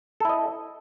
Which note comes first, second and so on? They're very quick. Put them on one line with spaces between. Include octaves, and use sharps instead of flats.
A4 E4 D#5